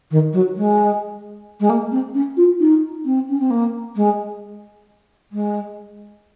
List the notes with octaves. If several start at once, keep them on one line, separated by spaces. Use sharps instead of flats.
D#3
F#3
G#3
G#3
A#3
C4
C#4
F4
D#4
C4
C#4
C4
A#3
G#3
G#3